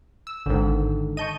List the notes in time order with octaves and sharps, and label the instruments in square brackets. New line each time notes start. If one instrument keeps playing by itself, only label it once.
[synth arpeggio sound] E6
[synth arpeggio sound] G#1 G#2 [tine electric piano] D3 D#3
[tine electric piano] D#5 A5 C#6 [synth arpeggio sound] G6 D#7